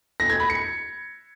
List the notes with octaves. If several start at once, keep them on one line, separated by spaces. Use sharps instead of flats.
A#6
G#6
B5
C#7